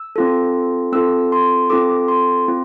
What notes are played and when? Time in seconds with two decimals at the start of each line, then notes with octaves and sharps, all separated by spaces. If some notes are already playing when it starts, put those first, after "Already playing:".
Already playing: E6
0.16 C4 F4 A4
0.92 C4 F4 A4 E6
1.32 C6
1.70 C4 F4 A4 D6
2.08 C6
2.48 C4 F4